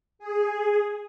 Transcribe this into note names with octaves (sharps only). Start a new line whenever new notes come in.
G#4